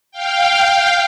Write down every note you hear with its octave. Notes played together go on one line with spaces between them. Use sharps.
F5 G5